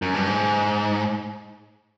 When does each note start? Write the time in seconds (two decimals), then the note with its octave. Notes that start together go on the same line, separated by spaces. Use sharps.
0.02 F#2
0.14 G2
0.27 G#2